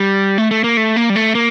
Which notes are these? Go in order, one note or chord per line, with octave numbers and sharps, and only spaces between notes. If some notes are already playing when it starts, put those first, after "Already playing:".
Already playing: G3
A3
A3
A#3
A3
A#3
G3
A3
A#3